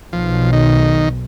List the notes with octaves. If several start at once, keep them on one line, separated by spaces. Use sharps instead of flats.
B1 F3
D#3